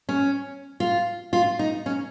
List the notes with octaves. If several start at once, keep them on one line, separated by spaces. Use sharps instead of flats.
C#4
F4
F4
D#4
C#4